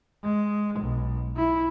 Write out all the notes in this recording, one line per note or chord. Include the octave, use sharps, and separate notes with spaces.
G#3
B1
E4